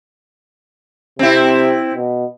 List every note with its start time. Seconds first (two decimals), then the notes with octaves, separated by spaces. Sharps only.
1.19 C3 C4 E4
1.94 B2